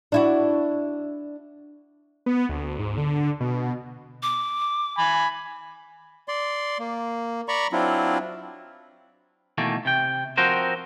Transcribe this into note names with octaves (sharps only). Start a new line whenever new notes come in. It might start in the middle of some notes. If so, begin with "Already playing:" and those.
D4 E4 F#4
B3
D2
G#2
D3
B2
D6
G#5 B5
D5 C6
A#3
D5 A#5 B5 C#6
F#3 C4 D4 E4 F4
B2 D#3 E3 A3 A#3
C3 G5
F3 C4 F#4 A#4 C5